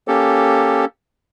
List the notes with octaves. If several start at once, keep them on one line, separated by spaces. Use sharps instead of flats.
A#3 C#4 G4 A4